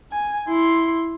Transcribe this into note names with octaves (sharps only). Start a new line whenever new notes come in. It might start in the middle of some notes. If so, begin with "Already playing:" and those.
G#5
E4 C6